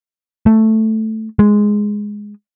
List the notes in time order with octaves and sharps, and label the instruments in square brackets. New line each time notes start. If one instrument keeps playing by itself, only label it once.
[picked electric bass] A3
G#3